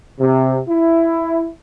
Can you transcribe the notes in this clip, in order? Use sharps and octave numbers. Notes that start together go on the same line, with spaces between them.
C3
E4